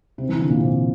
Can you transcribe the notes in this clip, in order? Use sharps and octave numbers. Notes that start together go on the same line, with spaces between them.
C3
E3
D3
A#2
C3